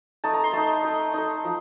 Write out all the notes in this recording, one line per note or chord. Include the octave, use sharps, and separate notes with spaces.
A3 D#4 A5
A#5
C6
A3 D#4 A5
A3 D#4
A3 D#4
F3